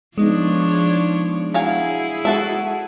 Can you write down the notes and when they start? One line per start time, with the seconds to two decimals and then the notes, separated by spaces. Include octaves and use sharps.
0.18 F3 G#3 B3 D4 D#4 C#5
1.54 F#3 E4 G#4 F5 G#5
2.25 G#3 F#4 A4 E5